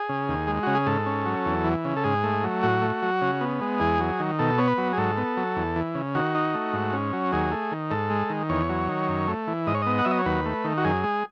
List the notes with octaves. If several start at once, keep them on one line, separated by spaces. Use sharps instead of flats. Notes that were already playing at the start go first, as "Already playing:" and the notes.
Already playing: G#4
C#3
D#2
G#3
C#3 F#4
G#4
G#2 A4
C#4
F#3
E2
E3
C#3
A4
G#2 G#4
A3
F#3
A2 F#4
A3
F#3
C#3
B3
G#3
E2 G#4
F#3
D#3
B2 A4
B3 C#5
B4
F#3
G#4
G#2 A4
B3
F#3
E2
E3
C#3
D#3 F#4
D#4
A3
G#2
C#4
F#3
D#2 G#4
A3
D#3
G#2 A4
G#3
D#3
E2 C#5
F#3
D#3
F#2
A3
E3
G#2 D#5
C#5
B3 D#5
F#5
F#3 E5
D#5
C#5
D#2 B4
A3
D#3
F#4
F#2 G#4
G#3